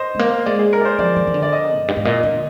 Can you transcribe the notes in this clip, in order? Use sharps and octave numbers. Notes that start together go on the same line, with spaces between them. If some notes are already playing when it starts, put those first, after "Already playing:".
Already playing: C5 D#5
G#3
A#3
G#3 D5
G#4
A#4
D5
C5
F3 D5
D#3
D#3
D3
D5
D#5
F2
G2
G#2
A#2 D#5
D3